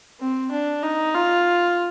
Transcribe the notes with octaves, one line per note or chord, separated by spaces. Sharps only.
C4
D4
D#4
F4